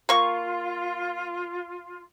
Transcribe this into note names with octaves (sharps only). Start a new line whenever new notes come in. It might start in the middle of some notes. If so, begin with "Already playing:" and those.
A#3 F4 C#6